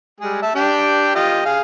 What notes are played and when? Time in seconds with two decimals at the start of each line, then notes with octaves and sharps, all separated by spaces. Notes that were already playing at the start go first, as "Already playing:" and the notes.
0.20 G3 G#3 G#4
0.42 E5 A5
0.56 D4 G4 G5
1.15 F4 G4 D#5
1.45 G#4 F5